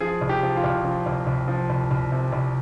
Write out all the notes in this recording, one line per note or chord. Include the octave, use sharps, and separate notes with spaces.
F3 G#4
C2
G4
F3
F4
C2
F3
C2
C2
F3
C2
C2
C3
C2